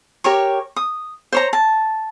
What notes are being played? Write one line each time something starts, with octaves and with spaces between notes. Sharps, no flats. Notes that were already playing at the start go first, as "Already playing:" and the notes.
G4 A#4 C#5 C#6
D#6
C5 C#5 A#5
A5